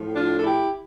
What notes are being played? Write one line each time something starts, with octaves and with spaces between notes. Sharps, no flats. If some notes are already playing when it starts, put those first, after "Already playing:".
Already playing: A2 F3
D4 F4
A4
E4 G4